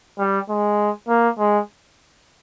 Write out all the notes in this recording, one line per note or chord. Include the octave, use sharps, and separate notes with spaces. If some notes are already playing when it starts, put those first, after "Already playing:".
G3
G#3
A#3
G#3